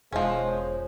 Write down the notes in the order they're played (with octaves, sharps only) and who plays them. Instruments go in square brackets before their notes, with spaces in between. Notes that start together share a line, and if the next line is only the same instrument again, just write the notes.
[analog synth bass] E1 [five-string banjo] F3 C#4 [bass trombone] G#3 [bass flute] C5